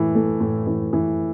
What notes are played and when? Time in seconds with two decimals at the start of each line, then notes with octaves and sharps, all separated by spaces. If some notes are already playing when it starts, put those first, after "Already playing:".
Already playing: A2 E3
0.15 A3
0.40 A2
0.67 E3
0.93 E3